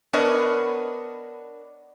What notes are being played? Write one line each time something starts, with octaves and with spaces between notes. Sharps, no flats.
B3 D4 A#4 B4 C#5 D#5